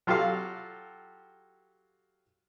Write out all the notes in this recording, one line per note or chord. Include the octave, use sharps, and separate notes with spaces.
F#3 F4 G4 A4 F5